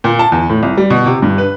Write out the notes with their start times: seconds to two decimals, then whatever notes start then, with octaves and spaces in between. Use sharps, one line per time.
0.04 A#2
0.19 A5
0.32 E2
0.50 A2
0.63 C2
0.78 G3
0.90 B2
1.06 C3
1.22 G2
1.38 B4